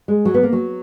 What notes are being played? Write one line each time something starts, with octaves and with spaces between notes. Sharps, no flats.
G#3
F#3
B3
A#3
F#3